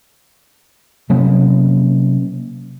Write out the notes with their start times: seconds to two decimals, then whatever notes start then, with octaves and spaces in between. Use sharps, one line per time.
1.10 C3 F#3 A#3 C#4